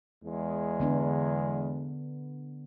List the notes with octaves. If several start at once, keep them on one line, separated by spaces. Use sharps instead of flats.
E2 G#3
D3 B3 D4